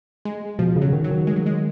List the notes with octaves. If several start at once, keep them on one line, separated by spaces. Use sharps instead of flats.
G#3
B2 F3
C#3
F#3
D#3
F#3
D#3
G#3
F#3
G#3